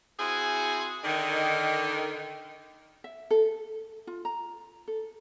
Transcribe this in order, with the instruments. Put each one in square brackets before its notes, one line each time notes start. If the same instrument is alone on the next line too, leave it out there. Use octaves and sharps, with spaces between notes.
[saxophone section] C4 E4 F#4 G#4
D3 D#3
[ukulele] E5
A4
F4
A#5
A4